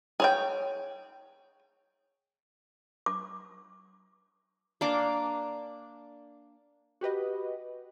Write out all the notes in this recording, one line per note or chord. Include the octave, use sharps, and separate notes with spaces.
G#4 C#5 G5
D6
A#3 D4 D6
F#4 G4 B4 D#5